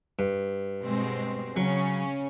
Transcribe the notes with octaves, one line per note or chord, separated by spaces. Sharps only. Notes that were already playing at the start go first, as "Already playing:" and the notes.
G2
B2 G#3 C4
C#3 F#3 C#4